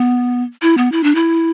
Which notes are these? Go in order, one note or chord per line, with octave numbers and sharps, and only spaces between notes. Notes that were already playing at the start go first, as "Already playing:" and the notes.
Already playing: B3
E4
B3
E4
D4
E4